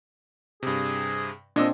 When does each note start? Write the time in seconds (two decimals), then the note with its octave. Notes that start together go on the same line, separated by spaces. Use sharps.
0.63 G2 C3 G#4
1.56 A#2 C4 D4 D#5 E6